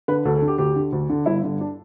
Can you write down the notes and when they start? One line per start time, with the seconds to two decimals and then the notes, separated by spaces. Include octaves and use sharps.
0.08 D3 B4
0.25 D2 A4
0.36 A4
0.42 D3
0.48 G4
0.58 D2 G4
0.76 D3
0.92 D2
1.09 D3
1.26 G1 E4
1.44 G2 D3
1.61 D4